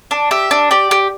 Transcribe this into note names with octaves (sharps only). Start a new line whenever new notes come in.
D4
G4 E5
D4
G4 D5
G4